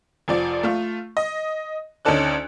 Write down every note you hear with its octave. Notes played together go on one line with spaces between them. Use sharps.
F1 F3 D5
A3 F4
D#5
D2 C#4 D#4 A4 D5 F#6